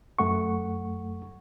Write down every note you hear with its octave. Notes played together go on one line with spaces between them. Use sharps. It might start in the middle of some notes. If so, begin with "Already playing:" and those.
F#2 A3 F#5 C#6